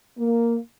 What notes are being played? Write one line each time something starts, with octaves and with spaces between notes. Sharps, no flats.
A#3